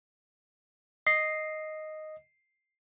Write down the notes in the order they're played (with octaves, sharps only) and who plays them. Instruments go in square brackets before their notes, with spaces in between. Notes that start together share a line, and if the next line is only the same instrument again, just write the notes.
[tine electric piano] D#5 [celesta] C7